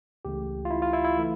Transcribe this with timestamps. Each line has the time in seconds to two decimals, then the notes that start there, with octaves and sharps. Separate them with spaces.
0.25 C#2 C#3 E3 A3 G4
0.65 F4
0.70 E4
0.82 F4
0.93 E4
1.05 E4
1.17 E3 A3